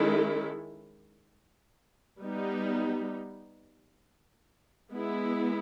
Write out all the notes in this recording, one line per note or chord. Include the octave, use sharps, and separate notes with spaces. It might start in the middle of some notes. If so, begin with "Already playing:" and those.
Already playing: D#3 G#3 C#4 E4 A4
G3 B3 D#4
G#3 B3 E4